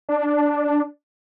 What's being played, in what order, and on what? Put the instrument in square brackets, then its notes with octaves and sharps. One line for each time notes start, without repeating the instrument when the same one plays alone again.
[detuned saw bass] D4